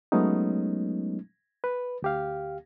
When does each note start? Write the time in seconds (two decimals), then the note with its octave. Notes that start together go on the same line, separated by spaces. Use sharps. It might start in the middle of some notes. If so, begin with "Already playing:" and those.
0.12 F#3 G#3 A3 B3 C#4 D#4
1.64 B4
2.02 D2 G4 F5